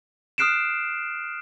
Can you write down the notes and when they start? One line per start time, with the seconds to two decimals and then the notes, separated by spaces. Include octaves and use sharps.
0.38 D#6 F6 F#6 C7 D7 E7